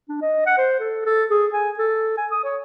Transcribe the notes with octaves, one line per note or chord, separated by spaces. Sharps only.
D4
D#5
F#5
C5
A4
A4
G#4
G#5
A4
G#5
D#6
C#5